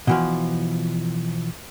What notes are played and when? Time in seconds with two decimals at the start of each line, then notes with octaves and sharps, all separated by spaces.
0.07 B2 E3 F3